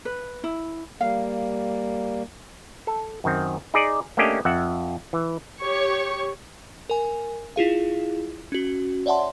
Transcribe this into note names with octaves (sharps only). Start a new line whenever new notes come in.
B4
E4
G3 A#3 F5
A4
F#2 D#3 C4
D#4 G#4 D5
A3 A#3 C#4 D4 G4 D#5
F2 E5 F#5
E3
G4 C#5 C#6
A#4 G#5
E4 F4 G#4 F5
C#4 F#4
C#5 D5 E5 F#5 A5 C6